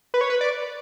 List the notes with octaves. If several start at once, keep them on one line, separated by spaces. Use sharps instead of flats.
B4
C#5
B4
D5